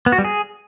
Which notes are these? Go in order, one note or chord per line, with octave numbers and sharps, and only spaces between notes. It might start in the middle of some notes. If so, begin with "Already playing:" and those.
B3
F#4
G3
G#4